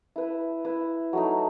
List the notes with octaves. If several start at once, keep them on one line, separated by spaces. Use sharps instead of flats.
E4 B4 E5
E4 B4 E5
F#3 A3 D#4